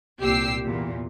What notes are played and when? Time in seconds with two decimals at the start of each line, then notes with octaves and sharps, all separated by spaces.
0.22 C2 A#2 G4 E6 C7
0.66 E2 A#2